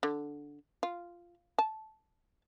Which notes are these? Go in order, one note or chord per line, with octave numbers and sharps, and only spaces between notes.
D3
F4
A5